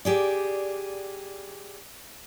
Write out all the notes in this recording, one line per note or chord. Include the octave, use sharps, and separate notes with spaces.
G4 G#4 D5